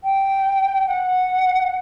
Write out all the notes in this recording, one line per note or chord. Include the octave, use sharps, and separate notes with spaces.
G5
F#5